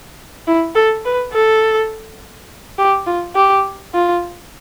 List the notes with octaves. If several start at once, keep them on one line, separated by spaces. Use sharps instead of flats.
E4
A4
B4
A4
G4
F4
G4
F4